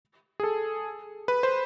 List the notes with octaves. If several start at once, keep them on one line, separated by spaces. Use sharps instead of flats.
G#4
A4
B4
C5